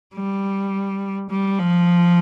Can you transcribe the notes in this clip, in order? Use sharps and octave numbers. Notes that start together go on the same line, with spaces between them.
G3
G3
F3